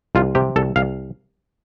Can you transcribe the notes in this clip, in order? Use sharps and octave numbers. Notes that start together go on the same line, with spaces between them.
C2 F4
C3 G4
C2 A4
C2 F5